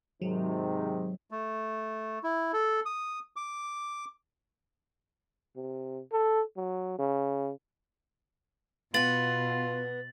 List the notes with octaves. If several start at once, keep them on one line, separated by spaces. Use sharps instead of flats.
G#2 C3 D#3 F#3
A3
E4
A4
D#6
D6
C3
A4
F#3
C#3
B2 B3 F4 F#5 A6 F#7